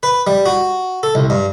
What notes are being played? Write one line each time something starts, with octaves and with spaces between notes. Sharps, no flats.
B4
G3
F#4
A4
C2
G2